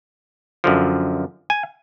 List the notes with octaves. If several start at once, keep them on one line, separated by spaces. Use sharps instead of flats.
F#2 D3 F3
G#5